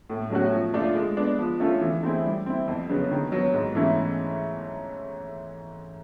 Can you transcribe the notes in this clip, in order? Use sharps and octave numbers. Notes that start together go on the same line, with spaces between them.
A2
F#3 A3 C#4 F#4
F3
A3 D4 F4
G#3
B3 D4
F3
A3 C#4 F4 A4
E3
A3 C4 E4 G#4
G3
C4 E4
F2
C#3 F#3 B3
D#3
F#3 B3
G#2
E3 A3 C#4 E4